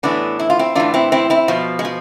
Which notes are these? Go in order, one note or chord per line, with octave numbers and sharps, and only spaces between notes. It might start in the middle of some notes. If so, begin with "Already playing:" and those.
A2 E3 B3 D4
E4
F4
C4 E4
A2 E3 D4 F4
C4 E4
C4 E4
C4 E4
B2 F3
G#3
F3